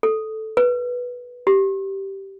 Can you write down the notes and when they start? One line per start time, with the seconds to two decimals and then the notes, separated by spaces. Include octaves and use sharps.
0.03 A4
0.57 B4
1.47 G4